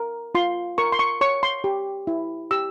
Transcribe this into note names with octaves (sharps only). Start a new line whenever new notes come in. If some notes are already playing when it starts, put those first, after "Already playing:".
Already playing: A#4
F4 C6
A#4 C#6
C6
C#6
C#5 C#6
C6
G4
E4
G4 E6